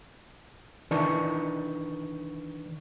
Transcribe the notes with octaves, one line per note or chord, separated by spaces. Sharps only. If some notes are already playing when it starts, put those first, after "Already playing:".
D#3 E3 D4 B4 C#6